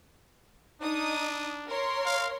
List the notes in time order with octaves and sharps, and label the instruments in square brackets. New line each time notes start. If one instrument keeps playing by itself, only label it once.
[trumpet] D4 [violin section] D#4 D#6
[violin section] A#4 C#5 C6
[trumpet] F5